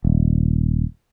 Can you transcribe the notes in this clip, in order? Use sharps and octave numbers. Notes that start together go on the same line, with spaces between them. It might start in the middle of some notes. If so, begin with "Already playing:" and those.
D#1